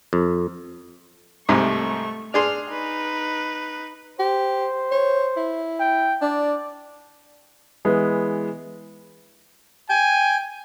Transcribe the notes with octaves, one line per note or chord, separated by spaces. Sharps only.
F2
C2 G#2 C3 A3 C#6
D4 G#4 C6 F6
D#4 B4
G4 C5
C#5
E4
G5
D4 D5
E3 G#3 B3
G5 G#5